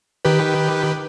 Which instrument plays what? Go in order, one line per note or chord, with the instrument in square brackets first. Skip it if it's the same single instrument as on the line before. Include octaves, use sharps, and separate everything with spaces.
[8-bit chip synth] D#3 G4 B4